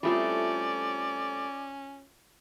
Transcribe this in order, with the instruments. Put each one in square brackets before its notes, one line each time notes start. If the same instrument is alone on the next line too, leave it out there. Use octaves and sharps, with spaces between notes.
[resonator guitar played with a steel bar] G3 A3 C4 [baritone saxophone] C#4 [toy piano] E4 F4 A4 [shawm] D5